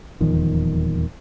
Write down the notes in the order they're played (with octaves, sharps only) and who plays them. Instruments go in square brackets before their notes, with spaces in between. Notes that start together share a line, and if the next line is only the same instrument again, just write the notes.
[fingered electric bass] D#1 E2 D#3 F3